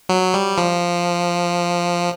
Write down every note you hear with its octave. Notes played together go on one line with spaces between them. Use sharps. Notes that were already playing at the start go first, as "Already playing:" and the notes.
F#3
G3
F3